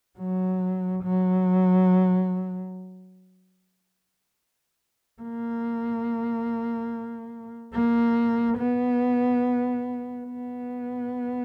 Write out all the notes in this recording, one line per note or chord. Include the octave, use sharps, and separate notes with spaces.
F#3
F#3
A#3
A#3
B3
B3